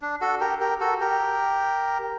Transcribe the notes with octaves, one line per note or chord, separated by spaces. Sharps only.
D4
F#4 A4
G4 A#4
G4 A#4
F#4 A4
G4 A#4